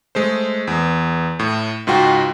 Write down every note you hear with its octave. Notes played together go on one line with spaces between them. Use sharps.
G#3 A3 C5
E2
A2
C#2 G#2 F4 F#4 G5